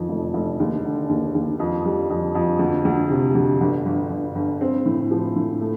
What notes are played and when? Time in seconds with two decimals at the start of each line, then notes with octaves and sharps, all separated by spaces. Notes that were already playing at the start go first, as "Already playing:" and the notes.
Already playing: F2 D#3
0.09 F1
0.34 F1
0.60 D#2
0.84 D3
1.09 D#2
1.34 D#2
1.59 F2
1.85 G3
2.10 F2
2.35 F2
2.59 D2
2.85 D2
3.10 C3
3.35 D2
3.61 G1
3.86 G1
4.11 G1
4.35 G1
4.61 C4
4.86 A2
5.11 F3
5.36 A2
5.61 A3